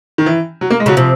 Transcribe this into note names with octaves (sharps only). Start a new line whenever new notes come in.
D#3
E3
F#3
A#3
G#3
C#3 F#3
C3 F3